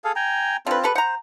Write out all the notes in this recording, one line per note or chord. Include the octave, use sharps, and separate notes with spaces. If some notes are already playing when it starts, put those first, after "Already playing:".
G#4 A4 F5
G5 G#5 A#5
D3 C4 F4 B4
G4 A4 B4
C5 F#5 A#5